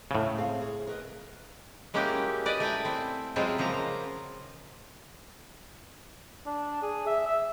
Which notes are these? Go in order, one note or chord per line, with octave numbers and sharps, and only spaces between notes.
A2 C#3
C4 G#4 F5
G#4
A#4 B4 D#5
G#3 A#3 C#4 E4 F#4 G4
B4 D5 D#5
A3 E4 G5 G#5
C4 E4
F#3 G#3 C4 E4 F4
C#3 F3 A#3 A#5
D4
G#4
E5
E5